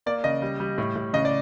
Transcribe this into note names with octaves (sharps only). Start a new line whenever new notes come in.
A#3 D5
C#3 D#5
G3
G3
A2
A2
C#3 D#5
D5